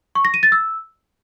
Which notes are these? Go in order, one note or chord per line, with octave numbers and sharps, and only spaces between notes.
C#6
A#6
D#7
A6
E6